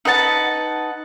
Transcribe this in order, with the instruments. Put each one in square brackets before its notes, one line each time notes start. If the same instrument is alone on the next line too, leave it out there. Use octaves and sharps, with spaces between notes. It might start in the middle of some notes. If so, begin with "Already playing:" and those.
[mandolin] D#4 B4 F#5 A5